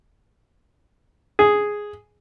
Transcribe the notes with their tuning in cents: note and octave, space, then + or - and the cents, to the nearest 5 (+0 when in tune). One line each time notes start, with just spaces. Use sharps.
G#4 +0